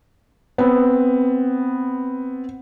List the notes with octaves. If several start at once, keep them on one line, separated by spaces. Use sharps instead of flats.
B3 C4